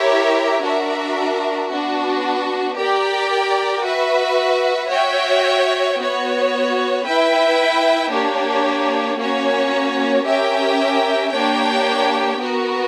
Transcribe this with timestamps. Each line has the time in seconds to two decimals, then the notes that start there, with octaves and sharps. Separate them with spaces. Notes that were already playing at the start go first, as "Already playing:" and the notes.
Already playing: E4 G4 A#4 C#5 E5
0.62 D4 F#4 A#4 E5
1.69 B3 D4 F#4
2.77 G4 A#4 D5 G5
3.83 F#4 B4 E5
4.90 F#4 C#5 E5 G5
5.97 B3 F#4 C#5
7.04 E4 B4 E5 G5
8.11 A#3 D4 G4 C#5
9.18 A#3 C#4 F#4 C#5
10.26 C#4 G4 A#4 E5 G5
11.33 A#3 D4 G4 C#5 G5
12.40 B3 F#4 A#4